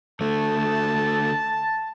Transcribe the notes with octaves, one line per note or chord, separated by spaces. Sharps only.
D3 A3 A5